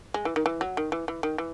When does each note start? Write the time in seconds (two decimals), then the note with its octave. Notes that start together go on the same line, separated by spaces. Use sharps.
0.14 G#3
0.25 E3
0.36 D#3
0.46 E3
0.61 F#3
0.77 D#3
0.92 E3
1.08 E3
1.23 D#3
1.38 E3